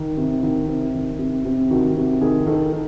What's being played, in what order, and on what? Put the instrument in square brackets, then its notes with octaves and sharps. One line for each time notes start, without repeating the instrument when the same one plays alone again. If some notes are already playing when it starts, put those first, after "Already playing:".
Already playing: [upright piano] D#3
C3
D#3
C3
D#3
C3
C3
D#3 F#4
C3
D#3 G#4
D#3 A4
D#3